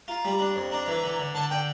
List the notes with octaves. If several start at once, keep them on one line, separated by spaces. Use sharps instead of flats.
F4 A#5
G3
D4
F2
D4 A#5
E3
D3
D3
D3 A5
D3 G5